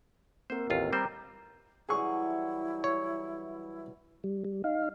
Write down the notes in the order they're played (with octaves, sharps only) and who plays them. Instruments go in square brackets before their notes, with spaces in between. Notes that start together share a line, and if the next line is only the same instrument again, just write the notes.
[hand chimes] A#3 C4 A#4 [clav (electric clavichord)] C5
[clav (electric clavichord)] A1 D#2 F4
[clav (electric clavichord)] G3 C4 C5 [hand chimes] G5 A#5 D6
[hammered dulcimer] E3 F#3 G3 [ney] E4 [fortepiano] G#4 C#6
[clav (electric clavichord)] C#5
[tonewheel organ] G3
G3
D#4 F5